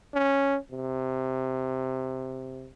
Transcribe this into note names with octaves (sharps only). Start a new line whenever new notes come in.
C#4
C3